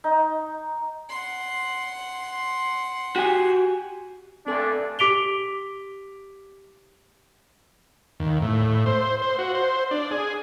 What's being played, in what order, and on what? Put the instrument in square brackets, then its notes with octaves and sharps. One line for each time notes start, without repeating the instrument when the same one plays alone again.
[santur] D#4
[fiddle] F#5 C6
[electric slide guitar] F#4 G4 G#5
[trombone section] G2 A3 D4 [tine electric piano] C4 A4 G#5
[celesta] G4 D6 B6 D7 F7 G7
[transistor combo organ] D#2
A2
C5
C5
F#4
C5
D4
G#4